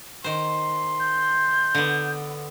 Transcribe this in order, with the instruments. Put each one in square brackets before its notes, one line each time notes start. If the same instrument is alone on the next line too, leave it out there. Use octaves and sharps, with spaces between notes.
[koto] D#3 C5 [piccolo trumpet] C6
[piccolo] G6
[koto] D3 B3